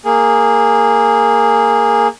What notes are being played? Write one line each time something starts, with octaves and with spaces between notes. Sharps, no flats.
A#3 G#4